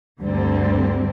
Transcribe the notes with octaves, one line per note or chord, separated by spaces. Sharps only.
D2 G2 D3 G3 C4